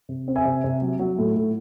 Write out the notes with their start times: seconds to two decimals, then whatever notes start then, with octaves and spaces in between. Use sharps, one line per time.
0.09 C3
0.28 C4
0.36 E5 G#5
0.45 C3
0.64 C3
0.82 F#3
0.99 F#3
1.18 A2
1.36 A2